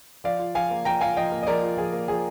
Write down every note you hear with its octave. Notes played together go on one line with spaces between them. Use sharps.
F3 D5 F5
F4
F3 F5 G#5
A#3
F3 G5 A#5
F4 F5 G#5
F3 D#5 G5
A#3
D#5
F3 A#4 D5
F4
F3 G#4
A#3
F3 G#4